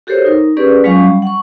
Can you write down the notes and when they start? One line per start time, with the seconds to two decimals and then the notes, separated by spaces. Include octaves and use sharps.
0.07 F#4 G4 A4 A#4 C5 C#5
0.25 D#4 A#4
0.57 C#4 G4 G#4 A#4 B4 D5
0.84 F#3 G#3 C#4 F4 F5 C#6
0.99 G3
1.22 F#5 C#6